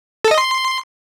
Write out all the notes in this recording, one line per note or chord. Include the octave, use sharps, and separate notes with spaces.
A4
D#5
C6